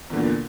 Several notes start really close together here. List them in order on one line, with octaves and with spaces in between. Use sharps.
E2 D3 A#2